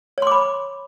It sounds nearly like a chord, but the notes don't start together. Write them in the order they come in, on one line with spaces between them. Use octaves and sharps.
C#5 C6 D6 B5